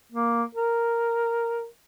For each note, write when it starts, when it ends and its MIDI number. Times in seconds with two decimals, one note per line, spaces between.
0.12 0.43 58
0.55 1.65 70